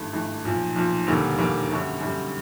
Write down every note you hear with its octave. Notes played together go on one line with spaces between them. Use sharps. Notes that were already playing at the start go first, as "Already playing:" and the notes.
Already playing: G#1 G2 E3 A3
G#1 G2 E3 A3
B1 A#2 F3
B1 A#2 F3
E1 D#2 D3 G3 A#3
E1 D#2 D3 G3 A#3
F#2 D3 G3
F#2 D3 G3